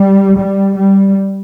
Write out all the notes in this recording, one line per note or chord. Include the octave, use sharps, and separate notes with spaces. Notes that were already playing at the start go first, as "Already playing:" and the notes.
Already playing: G3
G3
G3